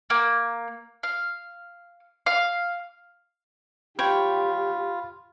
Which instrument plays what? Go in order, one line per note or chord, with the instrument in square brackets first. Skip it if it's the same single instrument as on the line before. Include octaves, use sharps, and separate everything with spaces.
[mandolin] A#3
F5
F5
[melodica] F4 [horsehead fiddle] G4 [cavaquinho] C#5 G5 [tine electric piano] B5